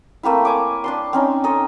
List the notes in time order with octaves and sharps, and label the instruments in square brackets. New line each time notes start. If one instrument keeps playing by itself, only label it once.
[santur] A3 A#3 C4 E4
G#5 D6
D4 A5 C6
C4 C#4 D#4
D#4 A4 D#5